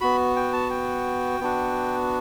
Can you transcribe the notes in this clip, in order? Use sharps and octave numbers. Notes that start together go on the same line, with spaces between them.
B3 F#4 B5
G5
A5
G5
B3 D4 F#4